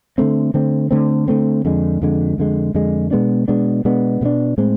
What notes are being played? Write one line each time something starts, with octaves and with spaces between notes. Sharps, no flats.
D3 A3 C4
D3 A3 C4
D3 A3 C4
D3 A3 C4
F2 D3 G#3
F2 D3 G#3
F2 D3 G#3
F2 D3 G#3
B2 G#3 B3 D4
B2 G#3 B3 D4
B2 G#3 B3 D4
B2 G#3 B3 D4
A2 G#3 C4